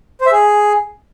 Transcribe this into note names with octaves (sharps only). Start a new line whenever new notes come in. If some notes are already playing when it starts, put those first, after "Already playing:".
C5
E5
G#4